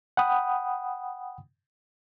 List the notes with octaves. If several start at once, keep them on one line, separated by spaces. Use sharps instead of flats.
F#5 G5 B5 D#6